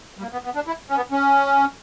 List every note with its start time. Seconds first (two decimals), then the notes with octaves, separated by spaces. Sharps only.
0.18 G3
0.22 A#3
0.33 B3
0.45 B3
0.55 D4
0.67 E4
0.90 C#4
0.96 B3
1.12 C#4